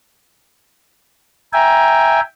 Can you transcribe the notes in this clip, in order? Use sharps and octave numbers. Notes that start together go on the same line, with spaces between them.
E5 G5 G#5 A#5